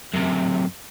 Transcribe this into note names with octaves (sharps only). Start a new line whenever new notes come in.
F#2 C3